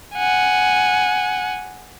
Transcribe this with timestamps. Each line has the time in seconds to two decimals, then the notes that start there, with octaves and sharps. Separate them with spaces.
0.15 F#5 G#5